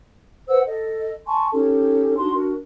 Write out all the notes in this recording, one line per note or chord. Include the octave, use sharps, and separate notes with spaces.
B4 C5 F#5 E6
A4 D#5
G#5 A5 C6 C#6
C#4 D#4 G4 A4
D4 D#4 F#4 C6
D4 F#4 A#4